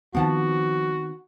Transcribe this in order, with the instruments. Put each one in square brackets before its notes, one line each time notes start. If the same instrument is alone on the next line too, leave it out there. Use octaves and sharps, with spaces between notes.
[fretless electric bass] D#3 B3 C4 [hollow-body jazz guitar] F3 F#5 A5 [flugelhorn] F#4